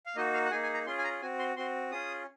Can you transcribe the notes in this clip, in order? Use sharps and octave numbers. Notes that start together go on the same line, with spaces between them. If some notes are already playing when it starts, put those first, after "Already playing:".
F5
A#3 D#4 F#4 D#5
F5
F#5
A#3 D#4 G#4 G#5
G#5
A#5
C#4 F4 G#4 C6
G#5
A#5
C4 F#4 G#5
C6
C4 F#4 C6
C#4 F4 G#4 D#6